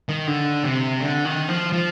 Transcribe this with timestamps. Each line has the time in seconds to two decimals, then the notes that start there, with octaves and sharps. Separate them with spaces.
0.09 D#3
0.27 D3
0.64 C3
1.00 D3
1.25 D#3
1.48 F3
1.73 F3